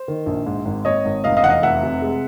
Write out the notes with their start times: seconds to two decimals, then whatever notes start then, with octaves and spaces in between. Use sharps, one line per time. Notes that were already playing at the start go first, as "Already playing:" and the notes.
Already playing: C5
0.08 D#3
0.26 A#1
0.46 G#2
0.65 G#1
0.85 G#1 C#5 D#5
1.05 G#1
1.24 F1 D#5 F5
1.37 D#5 F5
1.43 E2 F#5
1.50 D#5 F5
1.63 F1 E5 F#5
1.83 C3
2.02 G#3